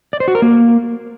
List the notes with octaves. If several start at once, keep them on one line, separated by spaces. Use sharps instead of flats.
D5
C5
F#4
A#4
A#3